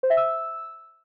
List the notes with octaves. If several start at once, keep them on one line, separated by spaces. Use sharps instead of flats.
C5
E5
E6